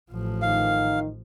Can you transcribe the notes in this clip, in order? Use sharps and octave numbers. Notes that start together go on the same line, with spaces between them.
A1 F3
D#3 D#4 F5